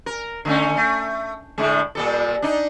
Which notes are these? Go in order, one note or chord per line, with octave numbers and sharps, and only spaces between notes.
A#4
D3 A3 C#4
A3
A2 D3 G#3
A#2 G3 A4
D4 D#4